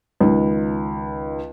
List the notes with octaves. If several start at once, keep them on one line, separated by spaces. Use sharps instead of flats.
C#2 D#3